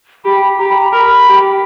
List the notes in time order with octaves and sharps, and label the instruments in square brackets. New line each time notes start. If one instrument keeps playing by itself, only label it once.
[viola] G4 [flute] B5
[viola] G4 [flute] A#5
[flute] B5
A#5
[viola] A#4 [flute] B5
[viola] G4